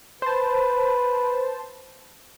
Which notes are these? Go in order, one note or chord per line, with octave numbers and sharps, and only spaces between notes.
B4 C5 A5